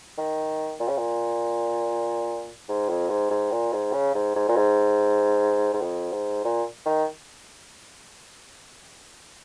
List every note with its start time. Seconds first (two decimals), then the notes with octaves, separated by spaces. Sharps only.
0.18 D#3
0.80 A#2
0.88 C#3
0.97 A#2
2.69 G#2
2.89 F2
3.10 G#2
3.30 G#2
3.51 A#2
3.73 G#2
3.93 C#3
4.15 G#2
4.35 G#2
4.49 A#2
4.56 G#2
5.73 G#2
5.82 F2
6.13 G#2
6.44 A#2
6.86 D#3